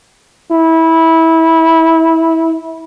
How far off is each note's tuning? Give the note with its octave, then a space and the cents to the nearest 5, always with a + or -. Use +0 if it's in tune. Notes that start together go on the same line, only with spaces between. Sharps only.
E4 -20